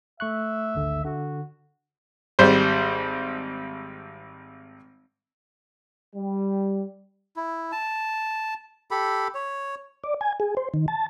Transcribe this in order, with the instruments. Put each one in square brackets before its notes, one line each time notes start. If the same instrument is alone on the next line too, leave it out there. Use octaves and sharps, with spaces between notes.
[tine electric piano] A3 C#6 F#6 [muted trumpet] E5
[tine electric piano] G#1 D2 D3
[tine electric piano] D3 [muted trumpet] F#4
[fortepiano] G#1 G3 C5
[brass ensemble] G3
[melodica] E4
A5
G4 A4 B5
C#5
[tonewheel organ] D5
G#5
G#4
C5
D#3
A5